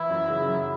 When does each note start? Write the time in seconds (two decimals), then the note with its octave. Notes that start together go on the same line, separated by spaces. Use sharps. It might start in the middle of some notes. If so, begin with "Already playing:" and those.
Already playing: E3 E4
0.09 F#2
0.28 C#3
0.48 F#2